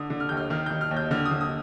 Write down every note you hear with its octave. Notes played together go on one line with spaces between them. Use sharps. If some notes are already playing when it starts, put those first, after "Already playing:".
Already playing: D3 D#6
D3
F6
D#2 G6
F6
D#3 F6
D#3 G6
F6
D#2
G6
D3 F6
D#6
D3
D#6